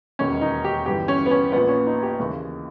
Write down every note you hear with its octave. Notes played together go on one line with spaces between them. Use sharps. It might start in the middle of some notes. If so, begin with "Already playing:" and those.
E1 D#2 D#3 C#4
D#4
G4
G1 G2 E3 G4
C#4
B3
C#4
A#1 A#2 B3
C#4
D#4
G4
D#2 C#3 E3